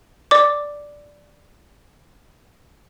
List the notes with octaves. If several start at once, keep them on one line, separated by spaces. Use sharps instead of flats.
D5 D6